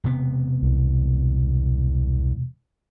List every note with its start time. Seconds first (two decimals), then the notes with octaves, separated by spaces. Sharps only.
0.04 E1 C3 B3
0.62 C2